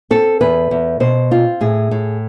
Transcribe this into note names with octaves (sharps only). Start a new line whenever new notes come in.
C4 A4
E2 B4
E2
B2 C5
C4 F4
A2 G#4
A2